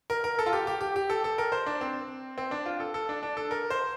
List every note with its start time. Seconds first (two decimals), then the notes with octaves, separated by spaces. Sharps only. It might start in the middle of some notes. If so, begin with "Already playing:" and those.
0.10 A#4
0.24 A#4
0.39 A4
0.46 F4
0.53 G4
0.67 G4
0.81 G4
0.96 G4
1.10 A4
1.24 A4
1.38 A#4
1.52 C5
1.66 D4
1.81 C4
2.38 C4
2.51 D4
2.66 F4
2.80 A4
2.94 A4
3.09 D4
3.23 D4
3.37 A4
3.51 A#4
3.70 C5